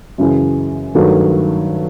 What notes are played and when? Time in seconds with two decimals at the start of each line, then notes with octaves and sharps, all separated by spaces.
0.18 F#2 C#3 E3 G#3
0.95 G2 D#3 F#3 A3